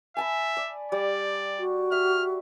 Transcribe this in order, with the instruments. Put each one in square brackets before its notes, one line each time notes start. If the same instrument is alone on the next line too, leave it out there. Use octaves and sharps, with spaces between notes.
[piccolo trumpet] E5 [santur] G#5 A5 B5
[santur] D5
[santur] G3 [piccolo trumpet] D5
[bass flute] F#4
[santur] E5 [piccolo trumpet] F6